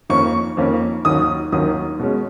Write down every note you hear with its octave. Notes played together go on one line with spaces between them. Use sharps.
F2 D#3 A#3 C#4 C#6
F2 D#3 A#3 C#4
D#2 D#3 F#3 C#4 D#6
D#2 D#3 F#3 C#4 D#6
B2 G#3 C#4